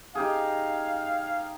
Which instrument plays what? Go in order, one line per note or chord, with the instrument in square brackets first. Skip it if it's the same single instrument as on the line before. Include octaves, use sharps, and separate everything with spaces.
[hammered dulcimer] D#4 G4 G#4 [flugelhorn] F5